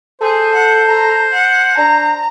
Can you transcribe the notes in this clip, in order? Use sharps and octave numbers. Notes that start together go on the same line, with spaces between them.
G#4 A4 C5
F#5
A#5
F#5
D4 A#5